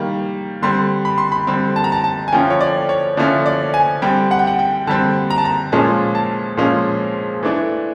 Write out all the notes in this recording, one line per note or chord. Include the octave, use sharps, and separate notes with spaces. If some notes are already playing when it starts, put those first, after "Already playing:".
Already playing: D#3 G3 A#3
D3 G3 C4 C6
B5
C6
B5
D3 G3 C4
A5
A#5
A5
A5
G#5
D3 F3 A3 C#4 G5
C#5
D5
C#5
D3 F3 A3 C#4 D5
D5
G#5
D3 G3 C4 G5
F#5
G5
F#5
G5
D3 G3 C4 A5
A#5
A5
A#5
A#2 F3 G#3 C#4 A5
A5
A#2 F3 G#3 C#4
E3 A3 D4